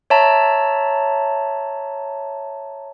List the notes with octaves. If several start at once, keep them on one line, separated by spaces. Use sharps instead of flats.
C#5 E5 A5 A#5